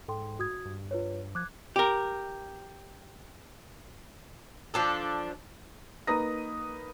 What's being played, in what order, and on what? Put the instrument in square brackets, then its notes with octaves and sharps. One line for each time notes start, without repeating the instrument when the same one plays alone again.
[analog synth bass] G#2 [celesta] A4 G5 C6
[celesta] F#4 D#6 G#6
[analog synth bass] G2
[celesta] F4 B4 C#5
[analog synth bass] F3 [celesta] D6 F#6 G#6
[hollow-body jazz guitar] G4 A#4
[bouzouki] F3 D4 A4
[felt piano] A#3 D#4 B4 A#5 D#6 A#6